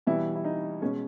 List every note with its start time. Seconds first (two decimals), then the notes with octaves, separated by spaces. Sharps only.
0.07 B2 E3 G3 E4
0.35 E4
0.45 D#4
0.82 B2 G#3 C#4